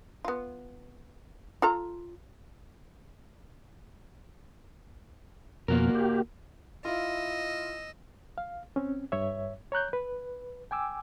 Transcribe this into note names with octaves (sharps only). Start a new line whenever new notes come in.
B3 F4
F4 A4 A#5
F2 B2 A#3 F#4 A#4
G4
E4 F4 D#5 E6
F5
C4 C#4
G2 C#5 E5
C#5 A#5 F#6 G6
B4
G5 G#5 D6 E6